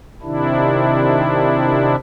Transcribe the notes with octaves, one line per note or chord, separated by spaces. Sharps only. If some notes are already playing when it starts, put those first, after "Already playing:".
C3 D#3 D4 E4